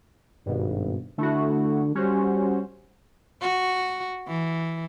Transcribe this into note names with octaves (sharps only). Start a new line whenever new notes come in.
G#1 G2 B2
D3 A3 E4 F#4
G3 C#4 F#4 C5
F#4
E3